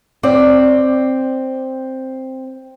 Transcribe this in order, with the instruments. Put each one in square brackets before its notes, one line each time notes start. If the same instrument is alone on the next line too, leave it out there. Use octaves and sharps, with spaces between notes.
[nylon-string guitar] C4 C5 D5